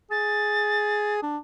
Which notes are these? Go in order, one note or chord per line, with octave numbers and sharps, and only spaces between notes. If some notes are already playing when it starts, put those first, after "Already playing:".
G#4 A6
D4